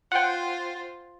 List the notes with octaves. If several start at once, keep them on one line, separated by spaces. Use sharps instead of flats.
F4 C5 F#5 G5